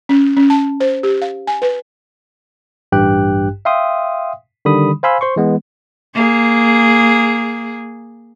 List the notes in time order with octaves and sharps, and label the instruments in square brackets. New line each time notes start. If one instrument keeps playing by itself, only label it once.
[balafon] C#4
C#4
A5
C5
G4
F5
G#5
B4
[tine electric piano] A1 G2 G4 G5 F#6
E5 F5 G5 C6 D#6
D3 D#3 G3 B5 D#6
C5 F5 G#5 B5 C6 E6
C5 C6 C#6
E3 G#3 B3
[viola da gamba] A#3 G#4